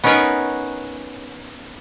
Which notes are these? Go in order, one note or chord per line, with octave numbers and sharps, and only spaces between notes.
B3 C#4 D#4 A#4 B4 C#5